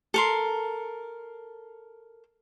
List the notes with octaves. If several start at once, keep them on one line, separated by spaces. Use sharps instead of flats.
A4 A#4 C6